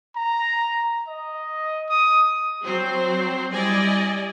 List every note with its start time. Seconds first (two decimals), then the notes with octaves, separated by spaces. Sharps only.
0.16 A#5
1.08 D#5
1.89 D#6
2.63 F#3 C4 C5
3.52 G3 E4 D5 D#5 G#5